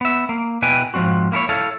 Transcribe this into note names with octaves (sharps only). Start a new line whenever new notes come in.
B3 E5
A#3
B2 E4 B4 G5 G#5
G#2 F3 G3 C4 F#4
A#3 E4 A4 C#5
E4 A4 C#5 F5